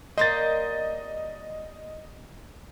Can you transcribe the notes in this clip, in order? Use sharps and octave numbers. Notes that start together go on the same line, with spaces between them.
G3 A#3 C5 D#5 A6